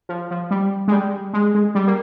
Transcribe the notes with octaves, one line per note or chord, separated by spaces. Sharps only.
F3
F3
G3
G#3
G3
G#3
G#3
G3
A#3